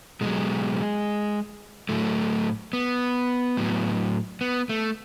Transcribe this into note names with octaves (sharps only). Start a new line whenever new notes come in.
B2 F#3 G#3
A2 F#3 A3
B3
A2 F#3
B3
A3